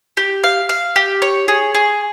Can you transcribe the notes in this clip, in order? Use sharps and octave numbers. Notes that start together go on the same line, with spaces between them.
G4
F5
F5
G4
C#5
G#4
G#4